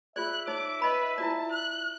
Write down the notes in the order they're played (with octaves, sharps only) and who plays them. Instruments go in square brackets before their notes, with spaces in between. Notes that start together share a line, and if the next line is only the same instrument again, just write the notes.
[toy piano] F4 G#4 D5 [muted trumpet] E5 [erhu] F#6
[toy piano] D#4 C#5 [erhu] D6
[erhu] B4 [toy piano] D#5 B5
[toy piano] E4 F4 D5 [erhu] A5
[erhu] F#6